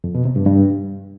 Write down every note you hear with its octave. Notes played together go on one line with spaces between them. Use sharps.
F2
B2
C3
G2
G2